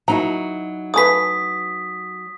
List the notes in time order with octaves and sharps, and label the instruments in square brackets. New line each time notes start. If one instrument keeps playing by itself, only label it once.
[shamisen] D#3 A#5 [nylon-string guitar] F#3 D#4 E4
[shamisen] A3 G#4 B4 [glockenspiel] D#6 B6